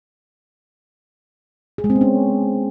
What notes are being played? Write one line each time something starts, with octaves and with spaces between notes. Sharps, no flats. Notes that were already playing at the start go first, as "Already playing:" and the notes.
G#4
G#3
C4
B3
C#4